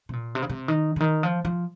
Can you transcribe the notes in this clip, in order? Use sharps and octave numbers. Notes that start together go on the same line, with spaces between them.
C3
A#2
C3
C#3
C3
D#3
C#3
D#3
F3
F3